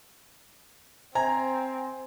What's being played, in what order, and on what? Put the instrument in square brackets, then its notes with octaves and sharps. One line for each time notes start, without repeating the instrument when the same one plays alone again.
[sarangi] C4 [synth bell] C5 [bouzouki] G#5 [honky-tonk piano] A#5